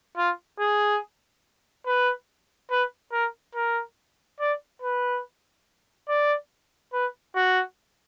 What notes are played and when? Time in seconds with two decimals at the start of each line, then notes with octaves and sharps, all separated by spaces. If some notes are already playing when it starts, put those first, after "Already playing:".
0.17 F4
0.59 G#4
1.86 B4
2.70 B4
3.12 A#4
3.55 A#4
4.40 D5
4.82 B4
6.09 D5
6.93 B4
7.35 F#4